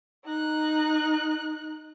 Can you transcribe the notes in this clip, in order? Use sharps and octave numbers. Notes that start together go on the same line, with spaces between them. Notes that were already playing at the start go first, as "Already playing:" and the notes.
D#4 F#6